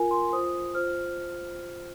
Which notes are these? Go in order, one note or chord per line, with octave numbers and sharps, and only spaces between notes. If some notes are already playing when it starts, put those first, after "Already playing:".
Already playing: F4 A#4 G#5
C6
F4 C5 D#6
F4 C5 F6